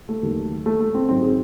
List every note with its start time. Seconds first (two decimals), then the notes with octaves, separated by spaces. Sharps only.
0.09 A3
0.23 D#2 D#3 F#3
0.66 A3
0.80 A3
0.94 C4
1.09 G#2 D#3 F#3 C4
1.22 G#4